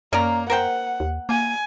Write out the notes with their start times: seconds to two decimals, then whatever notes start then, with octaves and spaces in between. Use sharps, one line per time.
0.13 F#2 A#3 C#4 D5 A#5
0.50 A#4 C5 F#5 G5
1.00 D#2
1.29 A#3 G#5